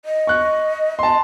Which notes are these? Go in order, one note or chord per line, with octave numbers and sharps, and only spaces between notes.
D#5
C#6 F#6
A5 C6